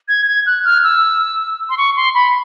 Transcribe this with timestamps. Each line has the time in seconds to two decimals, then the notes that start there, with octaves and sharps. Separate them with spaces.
0.08 G#6
0.27 G#6
0.46 F#6
0.65 F6
0.84 E6
1.70 C6
1.78 C#6
1.96 C6
2.15 B5